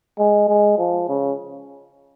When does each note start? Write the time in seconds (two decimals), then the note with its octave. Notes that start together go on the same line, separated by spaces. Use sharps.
0.19 G#3
0.48 G#3
0.78 F3
1.08 C#3